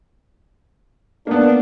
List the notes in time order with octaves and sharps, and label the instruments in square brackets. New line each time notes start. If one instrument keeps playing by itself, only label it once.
[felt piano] A#3 B3 [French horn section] D4